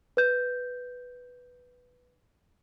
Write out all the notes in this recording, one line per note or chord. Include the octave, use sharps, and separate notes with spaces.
B4 G6